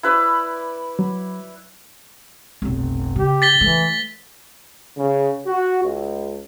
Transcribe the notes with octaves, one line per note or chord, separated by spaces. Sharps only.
E4 B4 D5
F#3
F1 B1
C#3 G4
A6 B6 G7
E3 A3
C#3
F#4
C#2